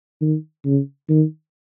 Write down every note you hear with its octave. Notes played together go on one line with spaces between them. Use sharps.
D#3
C#3
D#3